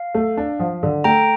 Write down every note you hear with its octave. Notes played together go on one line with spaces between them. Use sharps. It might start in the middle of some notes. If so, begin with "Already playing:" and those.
Already playing: F5
A3
D4
F3
D3
A3 G5 A#5